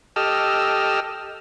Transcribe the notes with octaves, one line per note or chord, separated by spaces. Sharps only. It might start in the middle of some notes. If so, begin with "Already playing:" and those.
G4 A4 D#5 E6 F6